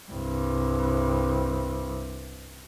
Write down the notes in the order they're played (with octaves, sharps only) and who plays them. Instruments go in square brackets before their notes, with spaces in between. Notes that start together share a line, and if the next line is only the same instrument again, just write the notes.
[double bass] C2 G2